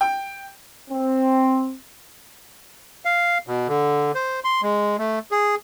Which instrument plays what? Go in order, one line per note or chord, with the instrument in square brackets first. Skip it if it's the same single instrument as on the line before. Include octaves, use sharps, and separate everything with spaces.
[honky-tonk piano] G5
[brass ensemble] C4
[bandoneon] F5
B2
D3
C5
C6
G#3
A3
G#4